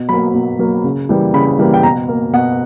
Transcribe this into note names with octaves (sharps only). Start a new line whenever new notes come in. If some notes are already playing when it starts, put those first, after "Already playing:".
Already playing: B2
F#3 A#3 B5
B2
F#3 A#3
C#3
E3 G3 A#3
C#3 B5
E3 G3 A#3
G5
B2 A#5
A#3
B2 F#5